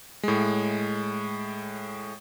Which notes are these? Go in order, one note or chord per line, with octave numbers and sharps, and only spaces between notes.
A2 G#3